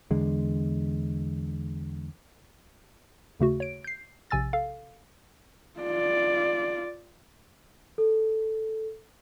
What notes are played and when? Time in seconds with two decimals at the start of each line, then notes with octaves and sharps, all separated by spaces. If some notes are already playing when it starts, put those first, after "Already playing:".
0.11 E2 D3 G#3
3.40 D#2 C#3 A3 F#4
3.60 C#5 D7
3.84 G6 C7
4.30 A#1 C3 G#5 E6 A6
4.53 A4 F5
5.80 F4 D5
7.98 A4